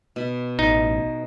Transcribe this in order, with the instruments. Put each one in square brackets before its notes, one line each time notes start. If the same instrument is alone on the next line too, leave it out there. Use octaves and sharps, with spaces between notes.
[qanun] B2 B5
[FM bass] A1 [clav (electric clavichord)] D#4